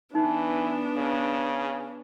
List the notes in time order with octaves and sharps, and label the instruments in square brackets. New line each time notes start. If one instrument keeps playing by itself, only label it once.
[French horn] E3 [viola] B3 D4 [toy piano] D#4
[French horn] C#3